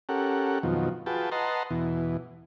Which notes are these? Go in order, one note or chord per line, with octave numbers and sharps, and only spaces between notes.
C#4 G4 A4 A#4 F#5
F2 B2 D#3 F3 F#3
F4 F#4 G#4 B4 G5 A5
B4 D#5 F#5 A5 A#5 C6
E2 B2 E3